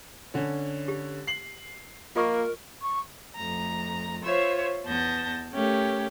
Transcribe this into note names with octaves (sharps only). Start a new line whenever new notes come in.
D3 C#4
G4
C7 F#7
A#3 F4 A#4 D#5 C#6
C#6
F2 A3 A#5
F4 C5 C#5 E5 E6
E2 B3 A5 G6 A#6
A3 C#4 G4 A#4